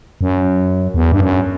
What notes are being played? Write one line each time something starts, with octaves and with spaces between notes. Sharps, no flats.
F#2
E2
G2
F#2